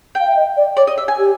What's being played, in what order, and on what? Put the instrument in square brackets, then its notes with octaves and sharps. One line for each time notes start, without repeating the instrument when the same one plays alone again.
[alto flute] F5 [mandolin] G5
[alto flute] E5
D#5
D5
[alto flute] C#5 [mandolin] D5
[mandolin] D#5
E5
G#5
[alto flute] G4